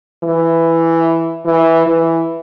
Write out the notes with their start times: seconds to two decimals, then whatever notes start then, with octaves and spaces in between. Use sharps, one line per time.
0.24 E3
1.45 E3
1.87 E3